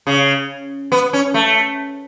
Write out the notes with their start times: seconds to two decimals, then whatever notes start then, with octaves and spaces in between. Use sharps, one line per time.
0.07 C#3
0.92 B3
1.13 C#4
1.34 A3